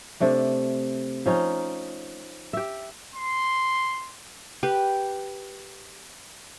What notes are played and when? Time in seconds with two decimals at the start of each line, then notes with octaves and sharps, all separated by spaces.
0.20 C3 A3 D4
1.26 F3 C#4 D#4
2.53 G4 E5
3.15 C6
4.63 G4 B4